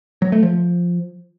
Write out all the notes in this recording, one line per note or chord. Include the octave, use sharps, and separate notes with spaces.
F#3
A3
F3